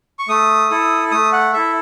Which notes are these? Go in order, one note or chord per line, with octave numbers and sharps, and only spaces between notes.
C#6
A3 D#6
E4 A4
A3 D#6
F#5
E4 A4 E5